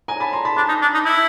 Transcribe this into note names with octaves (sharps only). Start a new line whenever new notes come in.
G#5 A#5
A5 B5
A#5 C6
A5 B5
D4 A5 B5
D#4
D4
D#4
E4